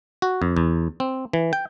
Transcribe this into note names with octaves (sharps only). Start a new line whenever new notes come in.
F#4
F2
E2
C4
E3
G5